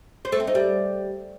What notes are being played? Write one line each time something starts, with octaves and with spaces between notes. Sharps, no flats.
C5
A3
C4
D#4
G3